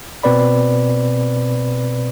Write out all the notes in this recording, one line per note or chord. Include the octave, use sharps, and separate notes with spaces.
B2 C4 B4 D5 B5